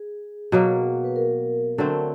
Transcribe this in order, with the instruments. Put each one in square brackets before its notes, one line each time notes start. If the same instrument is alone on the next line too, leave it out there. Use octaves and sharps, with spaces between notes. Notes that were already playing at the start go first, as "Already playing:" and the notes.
Already playing: [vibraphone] G#4
[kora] B2 F#3 A#3
[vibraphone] B4
A#4
[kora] D3 F#3 A3 C4